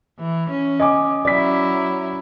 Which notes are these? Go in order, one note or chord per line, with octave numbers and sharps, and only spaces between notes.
E3
C#4
D#5 G#5 D6
F#3 C#4 E4 D5 B6